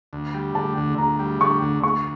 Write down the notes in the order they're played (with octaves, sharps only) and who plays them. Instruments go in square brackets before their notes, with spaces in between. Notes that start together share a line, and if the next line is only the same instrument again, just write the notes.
[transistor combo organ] D2
G3
[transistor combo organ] D3 [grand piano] A5
[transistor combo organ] D2
[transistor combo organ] D2 [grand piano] A#5
[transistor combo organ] G3
[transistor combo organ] D3 [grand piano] C#6
[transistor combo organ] D2
[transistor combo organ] D2 [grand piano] C#6